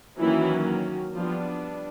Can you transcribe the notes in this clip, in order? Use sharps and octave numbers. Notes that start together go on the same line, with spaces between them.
D#3 E3 F#3 A#3 C#4 E4
F3 G3 B3 D4 F4